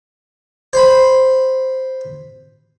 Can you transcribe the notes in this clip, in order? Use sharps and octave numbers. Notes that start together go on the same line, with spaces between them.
C5 B5